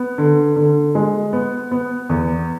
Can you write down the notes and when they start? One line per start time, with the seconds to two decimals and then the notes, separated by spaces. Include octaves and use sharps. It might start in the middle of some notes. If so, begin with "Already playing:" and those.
Already playing: B3
0.18 D3
0.56 D3
0.95 G#3
1.33 B3
1.71 B3
2.09 E2